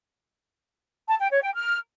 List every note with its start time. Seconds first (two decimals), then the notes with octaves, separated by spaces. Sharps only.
1.07 A5
1.19 G5
1.30 C#5
1.42 G5
1.53 F6